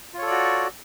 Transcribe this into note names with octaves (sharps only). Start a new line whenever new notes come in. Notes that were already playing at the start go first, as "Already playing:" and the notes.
F4 F#4 A4 C#5 D5